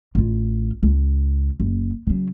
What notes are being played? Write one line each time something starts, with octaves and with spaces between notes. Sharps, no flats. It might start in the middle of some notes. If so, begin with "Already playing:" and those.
A1 F4
C#2
F#1
C#3 F#3